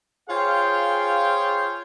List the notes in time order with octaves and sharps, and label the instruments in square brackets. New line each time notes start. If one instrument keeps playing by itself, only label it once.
[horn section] F4 G#4 C5 C#5 F5 G5